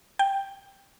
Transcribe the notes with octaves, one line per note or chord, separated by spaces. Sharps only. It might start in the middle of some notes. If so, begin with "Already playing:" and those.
G5